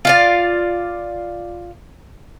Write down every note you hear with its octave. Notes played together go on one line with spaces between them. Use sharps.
F4 D5 F5